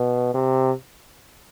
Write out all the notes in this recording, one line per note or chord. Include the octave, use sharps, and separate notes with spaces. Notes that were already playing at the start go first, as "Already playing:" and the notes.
Already playing: B2
C3